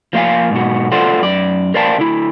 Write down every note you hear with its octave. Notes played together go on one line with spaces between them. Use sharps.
F3 A#3 C4 F5 G#5
G#2 B2 F#4
F4 A4 C5 D5 F#5
F#2 D5
A#4 C5 D5 F5 G5 A5
D3 E4